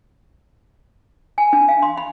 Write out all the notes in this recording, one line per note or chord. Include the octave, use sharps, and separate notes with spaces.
G#5
D4
F5
C6
B5